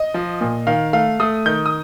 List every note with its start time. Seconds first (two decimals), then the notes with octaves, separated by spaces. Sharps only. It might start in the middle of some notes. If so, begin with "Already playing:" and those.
Already playing: D#5
0.14 F3
0.41 A#2
0.67 D#3 F5
0.93 A3 F5
1.20 A3 D#6
1.46 D#3 G6
1.66 D#6